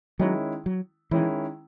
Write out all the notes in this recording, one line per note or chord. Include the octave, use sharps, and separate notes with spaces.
D#3 F#3 G#3 C#4 E4
F#3
D#3 E3 G#3 C#4 E4